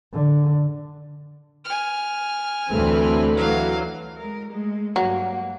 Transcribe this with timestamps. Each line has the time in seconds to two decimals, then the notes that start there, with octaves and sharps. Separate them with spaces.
0.13 D3
1.65 G#5 F6
2.70 D2 E3 A3 C4 B4
3.36 E3 F#3 F5
4.16 G#3 A#4
4.49 G#3 A3
4.96 G2 F#3 A#3